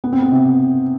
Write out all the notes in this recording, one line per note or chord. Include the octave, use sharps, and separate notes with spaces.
B3
C4
B3
C3